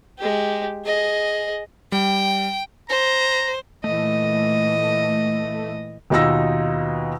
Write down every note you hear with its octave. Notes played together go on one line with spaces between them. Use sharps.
G#3 G4
G#4 D#5
G3 G5
C5 A#5
A#2 E3 A3 D#5
D#2 B2 D#4 F4 E6 A#6